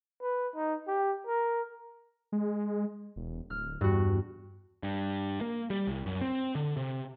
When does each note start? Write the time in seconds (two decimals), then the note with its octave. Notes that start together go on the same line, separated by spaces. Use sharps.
0.21 B4
0.55 D#4
0.87 G4
1.27 A#4
2.32 G#3
3.16 E1
3.50 D1 F6
3.81 E2 G2 F#4
4.83 G2
5.41 A#3
5.70 G3
5.87 C2
6.06 F#2
6.21 C4
6.55 D3
6.77 C3